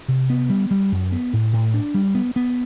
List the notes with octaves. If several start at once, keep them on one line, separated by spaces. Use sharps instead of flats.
C3
B3
G3
G3
F#2
B3
A2
A2
D4
G3
B3
B3